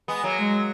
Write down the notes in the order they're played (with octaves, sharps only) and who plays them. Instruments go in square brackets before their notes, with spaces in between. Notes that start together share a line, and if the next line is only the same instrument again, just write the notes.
[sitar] G#3 B3
F#3 A#3
[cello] G#3